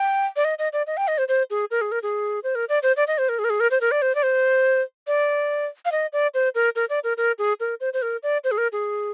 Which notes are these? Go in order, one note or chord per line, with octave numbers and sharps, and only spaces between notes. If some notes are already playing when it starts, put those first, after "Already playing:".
Already playing: G5
D5
D#5
D#5
D5
D#5
G5
D#5
C5
C5
G#4
A#4
G#4
A#4
G#4
C5
A#4
D5
C5
D5
D#5
C5
A#4
G#4
A#4
G#4
A#4
C5
A#4
D5
C5
D5
C5
D5
F5
D#5
D5
C5
A#4
A#4
D5
A#4
A#4
G#4
A#4
C5
C5
A#4
D5
C5
G#4
A#4
G#4